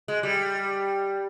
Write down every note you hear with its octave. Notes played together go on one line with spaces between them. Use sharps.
G#3
G3